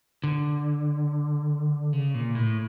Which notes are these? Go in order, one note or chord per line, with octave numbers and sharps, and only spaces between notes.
D3
C#3
A#2
A2